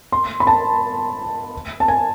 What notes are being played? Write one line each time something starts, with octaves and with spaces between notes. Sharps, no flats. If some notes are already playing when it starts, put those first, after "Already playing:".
C6
B5
A5
A5
G#5